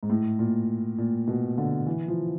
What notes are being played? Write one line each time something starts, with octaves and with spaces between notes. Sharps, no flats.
G#2
A2
A#2
A#2
B2
D3
E3
F3